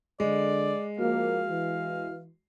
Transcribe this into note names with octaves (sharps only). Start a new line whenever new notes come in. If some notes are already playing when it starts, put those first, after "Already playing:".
D3 G#3 D5
F3 A#3 F#4 F5
E3